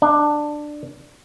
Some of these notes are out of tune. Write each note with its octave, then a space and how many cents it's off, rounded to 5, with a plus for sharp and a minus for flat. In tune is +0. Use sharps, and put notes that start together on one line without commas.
D4 +15